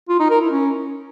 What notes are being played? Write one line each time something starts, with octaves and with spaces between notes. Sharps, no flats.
F4
D#4
A#4
E4
C#4